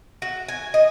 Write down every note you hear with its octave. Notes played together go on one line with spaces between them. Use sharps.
F#4
G#5
D#5